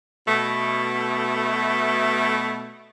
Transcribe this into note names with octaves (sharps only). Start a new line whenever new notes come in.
B2 A3